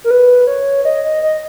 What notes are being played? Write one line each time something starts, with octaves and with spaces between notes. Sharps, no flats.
A#4
B4
C#5
D#5
D#5
D#5